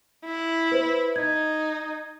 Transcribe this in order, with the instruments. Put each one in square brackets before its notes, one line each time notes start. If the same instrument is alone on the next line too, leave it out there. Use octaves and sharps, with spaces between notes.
[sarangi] E4
[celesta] B4 C5
[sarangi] D#4 [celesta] G#6